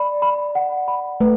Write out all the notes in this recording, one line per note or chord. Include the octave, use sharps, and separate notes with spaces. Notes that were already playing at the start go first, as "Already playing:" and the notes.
Already playing: D5 B5
B5
F#5
B5
A3 B4